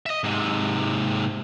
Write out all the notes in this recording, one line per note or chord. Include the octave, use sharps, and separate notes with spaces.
D#5 E5
G#2 C3